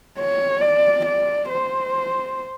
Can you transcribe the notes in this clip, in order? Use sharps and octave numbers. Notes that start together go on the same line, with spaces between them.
C#5
D5
D5
C5